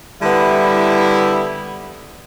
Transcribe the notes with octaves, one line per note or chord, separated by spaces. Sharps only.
D3 G3 B3 E4